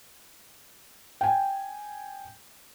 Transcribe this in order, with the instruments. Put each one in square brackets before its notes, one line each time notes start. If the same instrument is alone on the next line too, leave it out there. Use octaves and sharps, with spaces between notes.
[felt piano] G5 G#5